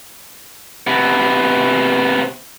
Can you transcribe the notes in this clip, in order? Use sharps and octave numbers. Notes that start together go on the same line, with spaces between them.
C3 B3